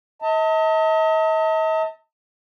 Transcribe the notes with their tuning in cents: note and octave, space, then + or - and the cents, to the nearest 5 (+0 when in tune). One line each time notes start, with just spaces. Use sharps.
D#5 +45 A5 +35